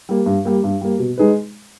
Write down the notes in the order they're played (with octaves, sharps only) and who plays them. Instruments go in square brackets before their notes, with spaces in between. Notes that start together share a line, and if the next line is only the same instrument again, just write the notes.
[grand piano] G3 A#3
G2
G3 A#3
G2
G3 A#3
B2
G#3 D#4 G#4 B4